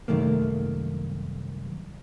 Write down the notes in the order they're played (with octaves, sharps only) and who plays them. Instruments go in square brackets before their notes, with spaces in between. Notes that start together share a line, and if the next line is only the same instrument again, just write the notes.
[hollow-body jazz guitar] C2 F#2 D#3 A3 A#3